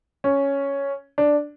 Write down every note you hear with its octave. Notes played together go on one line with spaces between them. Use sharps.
C#4
D4